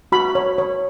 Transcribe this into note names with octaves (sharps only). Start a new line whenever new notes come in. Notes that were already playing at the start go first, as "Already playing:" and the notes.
F#4 B5
C#5
C#5